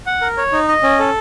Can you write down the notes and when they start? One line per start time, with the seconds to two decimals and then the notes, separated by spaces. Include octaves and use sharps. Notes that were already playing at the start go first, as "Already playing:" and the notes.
0.07 F#5
0.21 A#4
0.37 C#5
0.52 D#4
0.68 D#5
0.83 C#4
0.99 A4